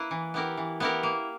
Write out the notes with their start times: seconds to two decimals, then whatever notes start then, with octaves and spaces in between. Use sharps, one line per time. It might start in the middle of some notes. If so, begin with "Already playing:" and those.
Already playing: A#3 E4 B4
0.11 E3
0.34 B3 E4 G4 A#4
0.57 E3
0.80 B3 E4 G4 A#4
1.03 A#3